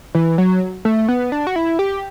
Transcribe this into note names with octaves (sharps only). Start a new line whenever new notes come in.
E3
F#3
A3
B3
D4
F#4
E4
G4